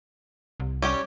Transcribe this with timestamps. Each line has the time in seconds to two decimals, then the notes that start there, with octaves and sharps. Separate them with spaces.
0.60 C2
0.82 G3 C#4 G4